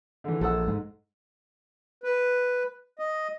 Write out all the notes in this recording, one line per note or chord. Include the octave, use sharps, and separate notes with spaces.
D3 E3
A#1 A4 F#5 E6
G#2
B4
D#5